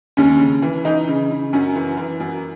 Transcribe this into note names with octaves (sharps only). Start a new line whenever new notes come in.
D#2 C#4
C#3
E3
E3 D#4
C#3
C#3
F#2 C#4
E3
E3
F#2